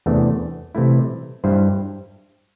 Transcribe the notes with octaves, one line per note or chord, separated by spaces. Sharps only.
E2 C3 E3 A3 D4
C3 E3 A3 E4
G2 G3 E4 C5